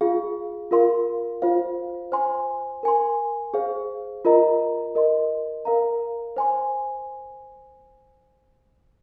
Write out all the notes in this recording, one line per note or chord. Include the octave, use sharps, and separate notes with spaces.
F4 G#4 F5
F4 A#4 F5 C6
F4 C5 F5
C5 G#5 C6
A#4 G#5 C6
G#4 C5 F5
F4 A#4 D#5 A#5
A#4 D#5 C6
A#4 F5 A#5
C5 G#5 C6